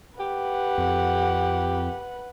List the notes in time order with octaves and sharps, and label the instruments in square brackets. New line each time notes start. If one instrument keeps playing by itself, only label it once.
[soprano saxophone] G4 [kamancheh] B4 F#5
[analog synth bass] F2